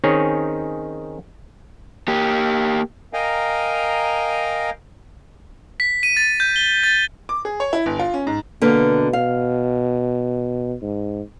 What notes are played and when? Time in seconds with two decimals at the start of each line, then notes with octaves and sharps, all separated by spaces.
0.04 D#3 C4 C#4 D#4 G#4 C#5
2.08 A#3 G4
3.14 A#4 D#5 F5 G5 G#5 A#5
5.80 B6
6.03 D#7
6.17 A6
6.40 G6
6.56 G7
6.84 A6
7.29 D6
7.45 G#4
7.60 C#5
7.73 E4
7.86 G1
7.99 F4
8.14 C#4
8.27 G#2
8.62 B2 D3 A#3 B4
9.13 F5
10.82 G#2